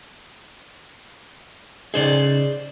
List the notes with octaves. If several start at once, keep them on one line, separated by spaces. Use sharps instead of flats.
C#3 D#4 G#4 C5 D5 D#5